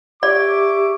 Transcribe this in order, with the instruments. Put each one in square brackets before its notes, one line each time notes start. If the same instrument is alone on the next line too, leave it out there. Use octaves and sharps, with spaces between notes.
[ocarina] G4 [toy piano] D5 [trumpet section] E5 C#6 D6